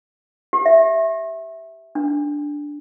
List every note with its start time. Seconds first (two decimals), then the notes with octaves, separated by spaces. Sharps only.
0.53 G4
0.66 E5
1.95 D4